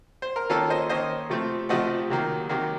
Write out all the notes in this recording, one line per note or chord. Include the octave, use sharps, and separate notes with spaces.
C5
A#4
D#3 A#3 C#4 F4 A4
C5 D#5
D#3 A#3 C#4 C5 D#5
C3 F3 A3 C4
C3 F3 A3 C4 D#5 F#5
C3 D#3 F#3 A#3
C3 D#3 F#3 A#3